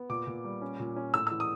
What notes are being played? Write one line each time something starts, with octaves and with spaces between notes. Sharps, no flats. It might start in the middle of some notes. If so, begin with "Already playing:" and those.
Already playing: B3
A#2 D6
A#2
G3
C#4
A#2
C#4
A2 E6
E3 E6
D#6